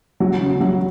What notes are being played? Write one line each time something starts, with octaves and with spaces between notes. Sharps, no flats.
F#3
C#3
F#3